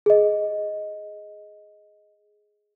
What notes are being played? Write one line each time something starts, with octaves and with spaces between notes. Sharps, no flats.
G#4 D#5